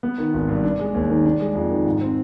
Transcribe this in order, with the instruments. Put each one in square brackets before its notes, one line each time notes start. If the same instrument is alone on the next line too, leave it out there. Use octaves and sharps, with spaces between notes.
[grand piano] B3
D#3
G#1
G2
D4
G#3
D#2
D#3
D4
G#3
F2
D#3
G#2
C4